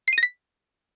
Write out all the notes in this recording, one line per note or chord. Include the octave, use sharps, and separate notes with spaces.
C7
D#7
A#6
B6